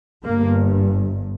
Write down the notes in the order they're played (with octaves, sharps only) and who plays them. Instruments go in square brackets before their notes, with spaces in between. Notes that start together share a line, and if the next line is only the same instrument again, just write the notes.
[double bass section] G1 G2 A#3